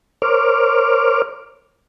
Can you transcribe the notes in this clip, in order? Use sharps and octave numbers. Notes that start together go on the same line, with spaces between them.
A#4 C5 C#5 D6 F6